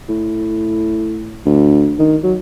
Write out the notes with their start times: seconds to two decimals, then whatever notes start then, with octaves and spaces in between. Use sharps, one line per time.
0.09 A2
1.46 D2
1.99 D#3
2.23 F#3